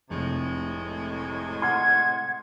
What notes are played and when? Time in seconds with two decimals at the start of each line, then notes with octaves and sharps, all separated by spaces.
0.10 F1 A2 C3 G#3
1.62 F#5 C6 F6 G#6